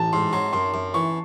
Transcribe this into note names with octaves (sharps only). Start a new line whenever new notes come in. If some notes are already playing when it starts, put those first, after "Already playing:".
Already playing: A1 A5
G#2 C6
F#3 C6
F#2 C6
F#2
E3 C#6